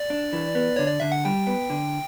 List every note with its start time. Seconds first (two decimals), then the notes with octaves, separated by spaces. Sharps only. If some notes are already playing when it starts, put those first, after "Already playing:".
Already playing: D5
0.10 D4
0.33 E3
0.55 B3
0.76 D3 C#5
0.88 D5
1.00 D3 E5
1.12 F#5
1.25 G3 G5
1.47 B3
1.70 D3